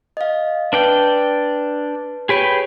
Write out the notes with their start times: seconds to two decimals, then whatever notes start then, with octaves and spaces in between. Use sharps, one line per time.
0.17 D#5 F5
0.73 D4 B4 D5 G5 A5
2.29 G4 G#4 B4 C#5 G5 B5